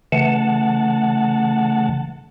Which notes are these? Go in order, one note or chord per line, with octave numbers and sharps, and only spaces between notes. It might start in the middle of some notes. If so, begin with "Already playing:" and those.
C#3 E3 A3 F#5 A5